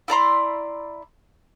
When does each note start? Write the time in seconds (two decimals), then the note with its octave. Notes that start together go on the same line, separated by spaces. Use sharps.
0.08 E4 D5 A#5 C6